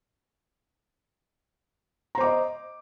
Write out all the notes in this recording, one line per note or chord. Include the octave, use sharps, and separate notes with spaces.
C5 D#5 A#5 D6